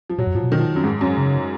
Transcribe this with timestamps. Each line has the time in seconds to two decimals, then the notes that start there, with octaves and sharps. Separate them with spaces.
0.10 F3
0.18 A#2 F#3
0.27 F#2
0.35 G#2 F3
0.43 B2
0.52 D#3
0.59 F3
0.76 F#2
0.84 G#2
1.01 F#2
1.18 C#3